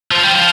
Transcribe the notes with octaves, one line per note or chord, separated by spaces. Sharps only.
F3
G3
F3